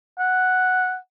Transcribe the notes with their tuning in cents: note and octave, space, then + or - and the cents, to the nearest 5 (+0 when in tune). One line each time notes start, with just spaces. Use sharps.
F#5 +0